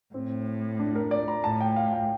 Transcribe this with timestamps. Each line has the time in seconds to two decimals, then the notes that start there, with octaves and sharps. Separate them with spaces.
0.14 A2 C4
0.80 D4
0.95 A#4
1.11 D5
1.28 A#5
1.44 A2 A5
1.60 G5
1.76 F5
1.93 G5